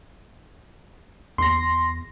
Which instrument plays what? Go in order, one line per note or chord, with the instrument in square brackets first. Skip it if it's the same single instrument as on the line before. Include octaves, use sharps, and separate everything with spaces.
[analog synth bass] E2 [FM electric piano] C6 A#6